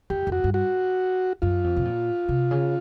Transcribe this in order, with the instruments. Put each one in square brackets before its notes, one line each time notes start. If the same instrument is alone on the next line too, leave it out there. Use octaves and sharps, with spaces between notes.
[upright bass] F2 [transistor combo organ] G4
[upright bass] F2
[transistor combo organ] F#4
[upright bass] G2
[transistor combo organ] F#4
[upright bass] F#2 [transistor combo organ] F4
[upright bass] F2
B2
A#2
C3
C#3